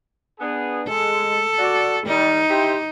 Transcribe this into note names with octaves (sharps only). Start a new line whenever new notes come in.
B3 D4 G#4
G#3 A4
F#4 D5
D#3 G3 D#4
E4 G4 C5